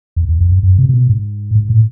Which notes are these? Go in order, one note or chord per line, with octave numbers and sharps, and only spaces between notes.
E2
E2
F2
F#2
F#2
C3
C3
B2
G#2
G#2
A2